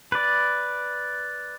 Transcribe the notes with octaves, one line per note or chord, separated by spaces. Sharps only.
B4 D5